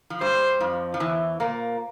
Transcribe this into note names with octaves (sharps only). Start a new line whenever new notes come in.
F3
G2 G3 C5
F2 F3
F3
E2 E3
A#2 A#3